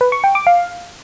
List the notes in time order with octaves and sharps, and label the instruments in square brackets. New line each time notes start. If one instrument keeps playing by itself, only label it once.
[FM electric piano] B4
C#6
G5
D6
F5